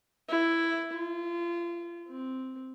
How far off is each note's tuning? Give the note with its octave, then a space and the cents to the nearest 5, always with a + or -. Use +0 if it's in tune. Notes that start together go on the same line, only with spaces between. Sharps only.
E4 +5
F4 -30
C4 -5